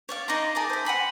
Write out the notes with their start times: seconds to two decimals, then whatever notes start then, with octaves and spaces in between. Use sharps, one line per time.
0.09 C#5 D5 F5
0.28 D#4 D5 A#5 C6
0.55 G#4 A#4 A5 D6
0.70 C5 E5
0.85 F#5 G#5 B5 C6